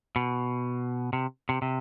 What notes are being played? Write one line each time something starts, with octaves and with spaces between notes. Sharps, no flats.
B2
C3
C3
C3